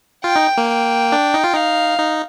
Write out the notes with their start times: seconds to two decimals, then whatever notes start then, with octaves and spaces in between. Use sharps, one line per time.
0.24 F4 G5
0.36 D#4
0.58 A#3
0.68 G5
1.12 D4
1.34 D#4
1.44 F4
1.53 D#4 F5
1.99 D#4